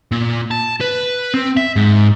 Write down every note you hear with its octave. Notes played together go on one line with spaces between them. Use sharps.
A#2
A5
B4
C4
E5
G#2